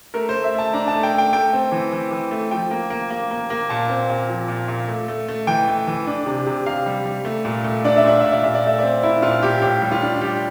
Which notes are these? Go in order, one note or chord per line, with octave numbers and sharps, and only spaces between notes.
A3 A#4
A3 C5
E5
A3 A5
D4 A#5
A3 A5
G5
A3 G5
A3 G5
C4
E3
E3
E3
A3
F3 G5
A#3
A#3
A#3
A#3
A#3
A#2 A5
C4
A#2
F3
A#2
A#2
A3
A3
A3
E3 G5
A3
E3
D4
C3
C3
C3 F5
G3
G3
A3
A#2
A3
D4 D5
E5
A#2 D5
A#2 E5
D5
A#2 E5
D5
A3 E5
C4 D5
A#2 E4
A#2 F4
A#2 G4
A2 G4
G3
F4
D4
G3 G4